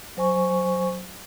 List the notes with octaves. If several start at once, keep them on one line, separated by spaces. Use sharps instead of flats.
F#3 C5 G#5 C#6